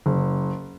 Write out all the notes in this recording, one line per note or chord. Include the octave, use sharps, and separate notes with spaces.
F#1